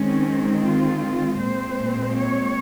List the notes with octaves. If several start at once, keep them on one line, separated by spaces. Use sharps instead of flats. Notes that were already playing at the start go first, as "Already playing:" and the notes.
Already playing: D#3 G#3 C4 C#4
F4
A#2 G#3 C4 C5
C#5